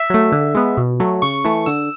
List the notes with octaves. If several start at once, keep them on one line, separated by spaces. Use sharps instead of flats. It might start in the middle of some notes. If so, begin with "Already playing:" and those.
Already playing: E5
F#3 A3
D3
G#3 B3
B2
F#3 A3
C#3 C#6
E3 A3
D3 E6